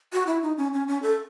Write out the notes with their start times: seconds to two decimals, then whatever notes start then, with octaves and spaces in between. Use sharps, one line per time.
0.13 F#4
0.27 E4
0.42 D#4
0.57 C#4
0.73 C#4
0.88 C#4
1.03 A4